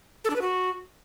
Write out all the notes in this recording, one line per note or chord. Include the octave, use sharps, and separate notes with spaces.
A4
D4
B4
F#4